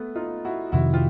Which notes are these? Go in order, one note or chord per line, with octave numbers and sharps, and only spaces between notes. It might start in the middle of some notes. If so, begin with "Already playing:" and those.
Already playing: A3 B3
D#4 F4
E4 F#4
F2 C3 D#3 E4 F#4
F4 G4